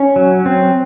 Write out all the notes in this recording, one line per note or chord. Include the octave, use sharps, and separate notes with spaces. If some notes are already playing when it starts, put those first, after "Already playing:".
Already playing: C#4
F#3
C4